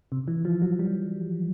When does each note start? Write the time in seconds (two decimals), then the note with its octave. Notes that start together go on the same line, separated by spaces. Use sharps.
0.12 C3
0.28 E3
0.45 F3
0.62 F#3
0.79 G3